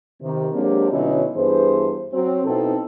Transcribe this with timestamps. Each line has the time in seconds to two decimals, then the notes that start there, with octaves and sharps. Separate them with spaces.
0.22 C3 D#3
0.54 F#3 G#3 A#3 C4 D4 G4
0.91 B2 D3 F#3 C#4 D#4 E4
1.35 G2 E3 B3 G#4 C5
2.13 F#3 C4
2.45 B2 C4 D#4 E4 A4